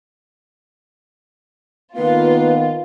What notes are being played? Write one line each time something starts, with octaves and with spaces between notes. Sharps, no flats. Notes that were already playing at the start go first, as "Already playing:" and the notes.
D#3 A#3 B3 F4 B4